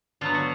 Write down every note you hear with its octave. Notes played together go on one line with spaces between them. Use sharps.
D3 F#3 B3 F4
F#4